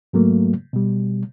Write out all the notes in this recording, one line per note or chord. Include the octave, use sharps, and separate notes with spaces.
G#2 F#3 A3 A#3
B2 G3